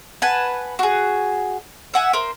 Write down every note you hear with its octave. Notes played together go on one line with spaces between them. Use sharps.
B4 F#5 G#5 A5
F#4 G#4
E5 F#5 G#5
A#4 C5